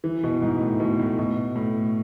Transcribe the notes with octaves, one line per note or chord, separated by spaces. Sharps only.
E3
B2
G#2
A2
B2
A2
B2
A2